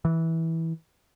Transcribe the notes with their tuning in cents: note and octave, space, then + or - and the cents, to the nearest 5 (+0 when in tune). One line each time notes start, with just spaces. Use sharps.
E3 -15